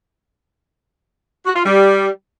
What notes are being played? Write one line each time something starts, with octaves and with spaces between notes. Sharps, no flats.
F#4
F4
G3